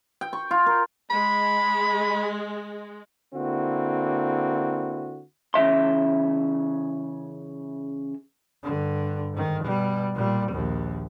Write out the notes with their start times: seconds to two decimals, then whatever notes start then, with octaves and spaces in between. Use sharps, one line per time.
0.21 G5
0.33 C#6
0.51 F4
0.66 A#4
1.11 G#3 B5
3.35 D3 A#3 C4 E4 F#4
5.54 C#3 E3 E5 C6
8.63 G2 D3
9.33 G#2 D#3
9.63 B2 G3
10.15 A#2 G3
10.52 A#1 D#2